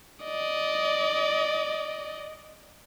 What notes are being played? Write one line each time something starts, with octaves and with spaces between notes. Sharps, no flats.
D5 D#5